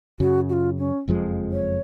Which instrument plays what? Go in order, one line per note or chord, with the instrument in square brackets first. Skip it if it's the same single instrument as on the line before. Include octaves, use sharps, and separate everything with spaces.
[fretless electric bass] F#2 C#3 F#3 [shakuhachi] F#4
[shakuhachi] F#4
F4
C#4
[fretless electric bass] F#1 F2 F3 G#3
[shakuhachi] C#5